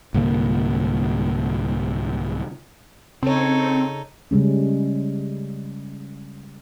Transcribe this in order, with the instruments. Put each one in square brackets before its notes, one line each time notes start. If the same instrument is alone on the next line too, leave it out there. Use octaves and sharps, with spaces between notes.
[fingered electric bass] C2 G#2 D3 A#3
[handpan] C#3 C#5 [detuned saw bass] C4 [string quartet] D#4 A4
[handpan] C#3 G3 G#3 C#4